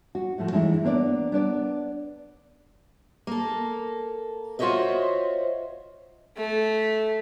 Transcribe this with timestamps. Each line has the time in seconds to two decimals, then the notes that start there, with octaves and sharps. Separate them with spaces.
0.15 F#4
0.38 A2 F3 A3 F#4
0.52 E3 G#3 D#4 E4
0.84 A#3 B3 D4 C#5 D5
1.32 B3 D4 D5
3.27 A#3 A4
4.59 F4 F#4 C5 C#5 D#5 E5
6.37 A3